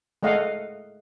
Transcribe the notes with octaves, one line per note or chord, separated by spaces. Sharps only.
G#3 A3 D#5 F5 F#5